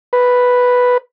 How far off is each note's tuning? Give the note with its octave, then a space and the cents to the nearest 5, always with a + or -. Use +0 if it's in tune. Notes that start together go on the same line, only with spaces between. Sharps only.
B4 +0